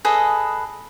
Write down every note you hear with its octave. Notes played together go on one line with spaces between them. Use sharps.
G#4 A4 B4 D#5